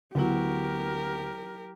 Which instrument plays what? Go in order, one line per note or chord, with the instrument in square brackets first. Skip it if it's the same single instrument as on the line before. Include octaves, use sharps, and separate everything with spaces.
[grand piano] D2 B3 F#4 [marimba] F#3 E4 [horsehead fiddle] G4 A#4